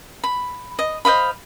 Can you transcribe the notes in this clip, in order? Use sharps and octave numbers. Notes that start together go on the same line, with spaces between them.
B5
D#5
C5 D#5 F5 B5